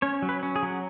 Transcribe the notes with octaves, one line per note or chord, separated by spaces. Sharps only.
C#4 C#5
F#3
B4
C#4
G#4
F#3